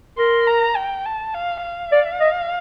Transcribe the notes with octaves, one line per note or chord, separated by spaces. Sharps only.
A#4 C6
A#5
G5
A5
F5
F5
D5
D#5